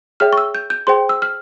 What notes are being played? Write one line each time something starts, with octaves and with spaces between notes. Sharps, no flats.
G#4 C#5 E5 G5 F6
C#6
E6
G6
G6
G#4 C5 G5 C6
E6
F6